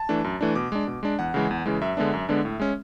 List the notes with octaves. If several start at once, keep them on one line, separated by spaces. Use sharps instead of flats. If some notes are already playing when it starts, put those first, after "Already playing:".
Already playing: A5
E3 A3 D4
F#2
E3 A3 D4
B2 D6
G#3 D4
B2
G#3 D4
E2 F#5
C#3 E3 G#3
E2
C#3 E3 G#3
F#2 E5
D3 G#3 B3 D4
F#2
D3 G#3 B3 D4
A2
G#3 C#4